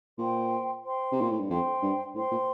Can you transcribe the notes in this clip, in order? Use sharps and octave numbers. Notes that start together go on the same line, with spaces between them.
A#2 C5 G5 C6
C5 G5 C6
C3
A#2
A2
G2
F2 C5 G5 C6
G2
A2 C5 G5 C6
A#2